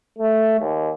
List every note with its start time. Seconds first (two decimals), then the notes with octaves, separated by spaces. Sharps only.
0.18 A3
0.60 D#2